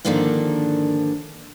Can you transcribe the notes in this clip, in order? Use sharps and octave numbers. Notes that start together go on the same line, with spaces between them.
G#2 D3 D#3 F3 A#3 D4